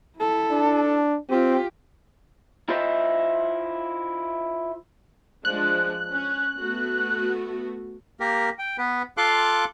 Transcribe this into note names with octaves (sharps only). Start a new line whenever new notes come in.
E4 A4
D4
C4 F4 G4
E4 F4 C5 D#5 E5
F3 G#3 D4 F#6
C#4
A3 B3 F#4
A#3 G4 A#4
G5
B3 B4
F4 A4 F5 C6 D6 F#6